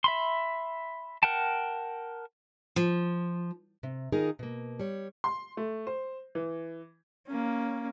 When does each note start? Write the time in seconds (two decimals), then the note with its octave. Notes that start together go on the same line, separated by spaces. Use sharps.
0.04 E5 B5 C6
1.23 A#4 F#5 G5 A5
2.76 F3
3.83 C3
4.12 D#3 D#4 F4 G#4 A#4
4.39 B2 A#3
4.80 G3 C#5
5.24 C6
5.57 A3
5.87 C5
6.35 E3
7.27 A#3 C#4